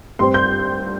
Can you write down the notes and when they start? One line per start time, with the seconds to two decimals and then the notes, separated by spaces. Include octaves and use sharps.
0.19 G2 G3 C4 C6
0.34 G6